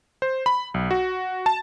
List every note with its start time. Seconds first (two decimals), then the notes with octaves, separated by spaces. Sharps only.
0.22 C5
0.46 B5
0.74 B1
0.91 F#4
1.46 A5